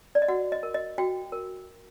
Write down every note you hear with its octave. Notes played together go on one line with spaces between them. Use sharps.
D5
D#5
F#4 F#5
D#5
A#4
D#5
F#4 G5
A#4